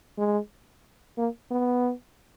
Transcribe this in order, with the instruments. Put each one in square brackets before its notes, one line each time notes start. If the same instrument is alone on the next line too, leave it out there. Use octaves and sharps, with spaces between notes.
[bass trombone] G#3
A#3
B3